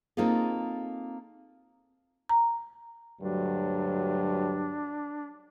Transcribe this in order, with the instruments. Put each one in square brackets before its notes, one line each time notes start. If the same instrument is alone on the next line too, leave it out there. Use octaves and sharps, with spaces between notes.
[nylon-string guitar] A#3 C4 D#4 F4 G#4 A4
[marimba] A#5
[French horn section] D2 G2 F#3 [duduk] D4